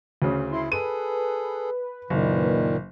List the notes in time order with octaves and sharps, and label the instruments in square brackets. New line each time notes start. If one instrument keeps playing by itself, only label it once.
[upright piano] D2 C#3
[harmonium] E4 [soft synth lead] C6
[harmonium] G#4 A4 [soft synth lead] B4 [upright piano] D#7
[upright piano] F#1 [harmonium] A#2 D#3